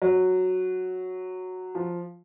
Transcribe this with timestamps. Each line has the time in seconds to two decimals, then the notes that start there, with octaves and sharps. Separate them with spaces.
0.02 F#3
1.75 F3